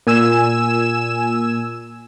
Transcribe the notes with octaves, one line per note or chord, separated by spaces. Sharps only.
A#2 G#5 E6 E7